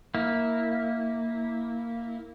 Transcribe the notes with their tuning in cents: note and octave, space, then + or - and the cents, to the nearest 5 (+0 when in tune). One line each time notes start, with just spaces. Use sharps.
A#3 -5 E4 -15